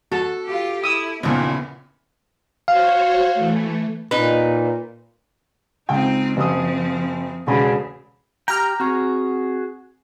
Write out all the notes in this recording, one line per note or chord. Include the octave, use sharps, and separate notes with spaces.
F#4 A4 A5
F4 G4
E4 D#6 E6
A#1 D#2 A#2 C#3 B3 E4
F#4 C5 C#5 F5
E3 A3
A#2 D#4 B4
C#2 C4 D#4 G5
F#1 F3 C4 D#6
E1 C#3 A3 G#4 B5
G4 G5 A#5 F6
C4 F#4 G#4 C#6